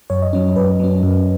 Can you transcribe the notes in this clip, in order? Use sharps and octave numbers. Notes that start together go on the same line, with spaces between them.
F#2 C#5
D#5
F#3 C#4 C#5
F#2 B4
F#3 C#4
F#2